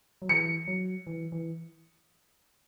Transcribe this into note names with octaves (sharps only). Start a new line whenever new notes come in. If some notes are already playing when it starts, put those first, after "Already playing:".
F#3
E3 C#7
F#3
E3
E3